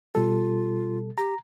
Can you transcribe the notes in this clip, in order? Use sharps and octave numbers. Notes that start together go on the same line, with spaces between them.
B2 G3 F4 A4
G4 A#5